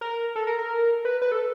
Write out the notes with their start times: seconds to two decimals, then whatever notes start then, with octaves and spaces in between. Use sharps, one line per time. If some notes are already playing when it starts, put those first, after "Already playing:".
0.01 A#4
0.36 A4
0.47 A#4
0.59 A#4
1.05 B4
1.22 B4
1.32 A4